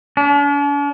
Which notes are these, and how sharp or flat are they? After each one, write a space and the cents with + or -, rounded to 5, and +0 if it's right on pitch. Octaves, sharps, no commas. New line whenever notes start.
D4 -45